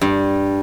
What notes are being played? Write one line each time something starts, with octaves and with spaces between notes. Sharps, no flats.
G2